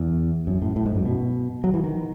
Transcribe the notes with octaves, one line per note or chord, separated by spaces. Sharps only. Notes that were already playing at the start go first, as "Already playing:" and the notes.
Already playing: E2
F#2
A2
A2
G#2
F#2
B2
F#3
E3
D#3